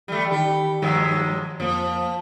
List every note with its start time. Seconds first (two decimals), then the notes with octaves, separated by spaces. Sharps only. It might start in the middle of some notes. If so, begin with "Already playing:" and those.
0.08 E3 G3 A3
0.31 D#3 G4 B5
0.82 G2 D#3 F3 F#3 G#3 E6
1.60 F2 F3 A#3